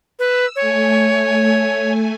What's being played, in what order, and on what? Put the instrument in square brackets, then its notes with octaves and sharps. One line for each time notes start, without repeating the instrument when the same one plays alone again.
[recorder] B4 [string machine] E6
[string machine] A3 G#5 [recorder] C#5